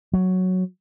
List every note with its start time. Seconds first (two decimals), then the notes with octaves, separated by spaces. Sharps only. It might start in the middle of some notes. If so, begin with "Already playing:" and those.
0.13 F#3